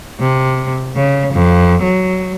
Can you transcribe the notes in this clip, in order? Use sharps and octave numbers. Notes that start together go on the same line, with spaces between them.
C3
C#3
F2
F#3